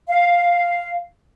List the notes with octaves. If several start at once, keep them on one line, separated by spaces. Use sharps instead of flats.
F5